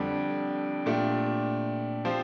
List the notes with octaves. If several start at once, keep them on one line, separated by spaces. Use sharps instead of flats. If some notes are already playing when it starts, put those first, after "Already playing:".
Already playing: F2 D3 G3 D4
A#2 A3 D4 G4
F3 C4 G4 C5